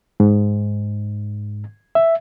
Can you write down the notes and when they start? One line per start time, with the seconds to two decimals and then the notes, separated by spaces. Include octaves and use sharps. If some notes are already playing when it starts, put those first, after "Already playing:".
0.20 G#2
1.95 E5